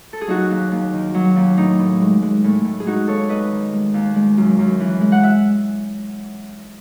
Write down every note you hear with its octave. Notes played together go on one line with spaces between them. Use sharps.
A4
G#4
F#3 D#4 F#4
D#2
D#2
D#3
F#3
D#2
A2 D#4
A2
G#3
G#3
A2
A2
G#4
G#3 D#4 F#4
D#2 A4 C#5
D#2 B4 D#5
D#3
G#3
D#2
G#3
F#2
F#2
E3
G#3
F#5
E5